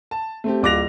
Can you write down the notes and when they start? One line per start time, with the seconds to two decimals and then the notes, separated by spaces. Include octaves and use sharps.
0.11 A5
0.44 A3 C4 G4
0.62 D1 F4 D6 F#6 A#6 F7